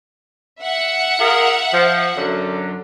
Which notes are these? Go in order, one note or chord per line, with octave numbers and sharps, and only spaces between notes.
E5 F#5
F4 G#4 A#4
F3
F#2 D3 F#3